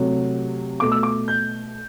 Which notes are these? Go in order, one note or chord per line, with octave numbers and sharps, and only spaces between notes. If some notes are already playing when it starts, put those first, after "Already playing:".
Already playing: C3 F#3 A3
B2 A3 D6
E6
D6
G6